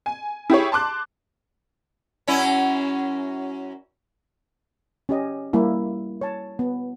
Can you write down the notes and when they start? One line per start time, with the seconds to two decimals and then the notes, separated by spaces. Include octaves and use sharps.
0.06 G#5
0.50 E4 G4 G#4 C#5
0.72 A5 C6 D6 F#6
2.27 F#2 C#4 E4
5.09 C#4 G4 D#5
5.53 G3 A#3 E4
6.21 C#5 A5
6.59 B3